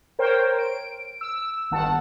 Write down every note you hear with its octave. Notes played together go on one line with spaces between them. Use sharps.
A#4 C5 C#5 G5
D7
E6
G1 D#3 F#5 A5